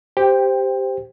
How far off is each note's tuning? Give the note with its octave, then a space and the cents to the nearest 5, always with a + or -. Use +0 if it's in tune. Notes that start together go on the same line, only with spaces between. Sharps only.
G4 +0 C5 -10 G5 +15